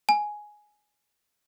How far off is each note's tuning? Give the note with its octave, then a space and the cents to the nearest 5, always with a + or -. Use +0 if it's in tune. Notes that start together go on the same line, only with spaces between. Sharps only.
G#5 +10